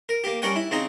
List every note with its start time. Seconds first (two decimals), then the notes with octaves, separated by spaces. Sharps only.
0.09 A#4
0.24 A#3 G4
0.42 G3 C#4 A#4 C#5 F#5 G5
0.56 E4
0.71 C#3 C4 D#4 A#5